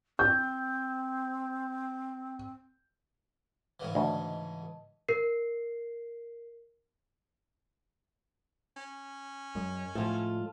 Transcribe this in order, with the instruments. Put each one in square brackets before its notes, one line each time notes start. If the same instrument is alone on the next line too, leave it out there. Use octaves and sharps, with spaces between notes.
[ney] C4 [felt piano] G6
[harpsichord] G#2 C#3 E3
[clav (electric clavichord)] D2 [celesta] D#5 A5
[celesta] A#4 C7
[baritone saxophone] C#4
[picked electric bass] F#2 [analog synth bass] G#3
[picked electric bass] A2 F3 [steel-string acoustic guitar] F4 A4